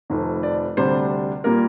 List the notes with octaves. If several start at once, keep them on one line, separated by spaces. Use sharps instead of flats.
F1 F2 D#3
D5
D2 C3 G3 D4 C5
A#2 G3 A#3 A#4